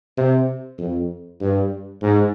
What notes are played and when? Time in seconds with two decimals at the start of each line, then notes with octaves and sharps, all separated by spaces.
0.18 C3
0.78 F2
1.40 G2
2.02 G#2